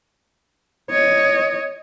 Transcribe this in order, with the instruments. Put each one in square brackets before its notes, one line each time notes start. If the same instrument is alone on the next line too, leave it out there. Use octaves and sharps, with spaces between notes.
[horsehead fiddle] C#5 D#5